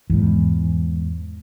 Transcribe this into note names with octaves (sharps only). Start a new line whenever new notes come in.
E2 G#2